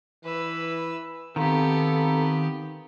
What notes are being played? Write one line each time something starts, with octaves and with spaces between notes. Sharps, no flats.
E3 B4 E6
D#3 B3 C4 G4 A4 F5 A#5